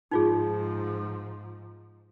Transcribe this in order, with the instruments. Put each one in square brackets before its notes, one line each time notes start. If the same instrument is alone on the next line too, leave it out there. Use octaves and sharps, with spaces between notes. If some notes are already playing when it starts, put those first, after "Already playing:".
[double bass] G#2 F3 [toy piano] D#4 F4 G#4